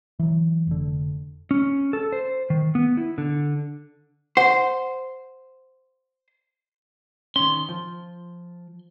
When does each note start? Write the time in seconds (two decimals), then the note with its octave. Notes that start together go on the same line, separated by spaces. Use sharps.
0.19 E3 F#3
0.67 F1 D3
1.51 C#4
1.93 A4
2.12 C5
2.50 D#3
2.75 B3
2.97 E4
3.18 D3
4.37 C5 F#5
7.36 D#3 C#4 C6
7.69 F3